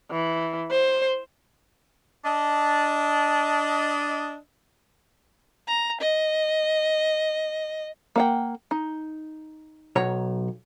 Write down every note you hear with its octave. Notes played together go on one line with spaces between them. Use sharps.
E3
C5
D4 D#5
A#5
D#5
A#3 F#5 G5
D#4
B1 C#5 A#5